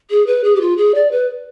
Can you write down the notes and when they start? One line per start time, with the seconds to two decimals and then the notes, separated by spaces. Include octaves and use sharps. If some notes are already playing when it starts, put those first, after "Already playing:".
0.10 G#4
0.26 B4
0.43 G#4
0.55 G4
0.60 F4
0.77 G#4
0.94 D5
1.11 B4